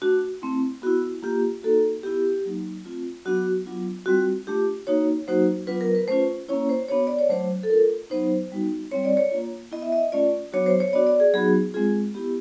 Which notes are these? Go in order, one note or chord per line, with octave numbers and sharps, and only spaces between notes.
A3 D4 F#4
A3 C4 E4
B3 E4 F#4
A#3 D4 F4 G4
A#3 D#4 F#4 A4
B3 E4 G4
F#3 A#3 D#4
A3 C4 F4
F#3 B3 D4 F#4
F#3 B3 D4 F4
G3 C4 F4 F#4
A3 D4 F4 G4
A#3 D#4 F#4 C#5
F#3 A#3 D#4 F#4 C5
F#3 B3 D4 F4 B4
A#4
B4
A3 C#4 F4 C5
A#3 C#4 E4 C#5
C5
B3 D4 F#4 C#5
D5
C#5
F#3 A3 D4 C5
A4
A3 D4 F4 A#4
F#3 B3 D#4 C5
G3 B3 D#4 F#4
G3 C4 E4 C#5
D5
C#5
A#3 D4 F4
B3 E4 D#5
E5
D#5
A3 C#4 F4 D5
F#3 B3 D4 F#4 C#5
C5
C#5
B3 D4 F#4 D5
D5
G#4
F#3 B3 D#4 F#4 G#4
G#3 C4 F4 G#4
B3 E4 G4